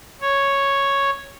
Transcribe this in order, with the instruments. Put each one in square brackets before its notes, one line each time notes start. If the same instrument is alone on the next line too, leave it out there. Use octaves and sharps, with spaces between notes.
[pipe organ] C#5